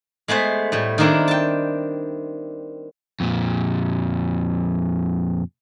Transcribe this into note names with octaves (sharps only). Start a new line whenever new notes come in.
G#3 A3 B3 C5
A2 G3
D#3 A#3 C4 D4 E4
G5 A5
F2 A#2